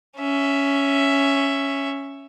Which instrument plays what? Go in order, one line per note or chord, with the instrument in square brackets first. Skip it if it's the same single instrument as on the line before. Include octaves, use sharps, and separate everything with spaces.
[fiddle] C#4 E5